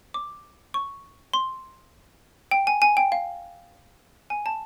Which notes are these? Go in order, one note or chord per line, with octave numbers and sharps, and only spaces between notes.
D6
C#6
C6
G5
G#5
G#5
G5
F5
G#5
A5